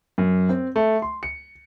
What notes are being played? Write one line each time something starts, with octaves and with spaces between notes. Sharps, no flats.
F#2
C4
A3
C6
C#7